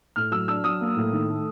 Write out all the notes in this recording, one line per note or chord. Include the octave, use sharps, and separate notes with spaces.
A2 F6
F#3 E6
D4 E6
F#3 D#6
A#3
A2
D#3
A3